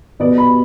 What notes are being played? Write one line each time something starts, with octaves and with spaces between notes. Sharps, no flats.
B2 B3 D5
B5